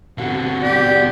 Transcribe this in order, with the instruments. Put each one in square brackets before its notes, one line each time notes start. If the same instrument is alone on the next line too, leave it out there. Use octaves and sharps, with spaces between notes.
[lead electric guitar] B2 D3 [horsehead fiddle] C4 F#4
[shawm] G4 [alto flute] D5